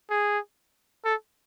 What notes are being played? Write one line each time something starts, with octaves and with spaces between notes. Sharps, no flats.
G#4
A4